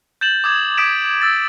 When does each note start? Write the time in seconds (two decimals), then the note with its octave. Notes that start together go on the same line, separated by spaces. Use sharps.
0.21 G6 A6 E7 F#7
0.44 D6 D#6 G#6
0.77 D#6 G#6 B6 D7 E7
1.21 E6 A6